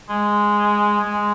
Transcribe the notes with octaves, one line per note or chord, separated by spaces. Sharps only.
G#3
G#3